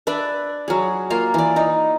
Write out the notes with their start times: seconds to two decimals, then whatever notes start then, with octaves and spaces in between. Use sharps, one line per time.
0.07 D4 B4 D5 E5
0.68 F#3 G#4
1.10 A#3 F4 F5
1.34 E3 D5
1.56 D#4